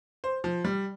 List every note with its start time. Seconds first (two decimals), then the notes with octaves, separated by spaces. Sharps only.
0.24 C5
0.44 F3
0.65 G3